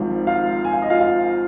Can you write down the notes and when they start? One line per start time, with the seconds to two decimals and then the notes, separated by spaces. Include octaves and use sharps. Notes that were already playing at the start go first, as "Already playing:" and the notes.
Already playing: G#1 G#2 F3
0.27 F4 F5
0.64 G#5
0.73 F5
0.82 D#5
0.90 F4 F5
1.00 F4 F5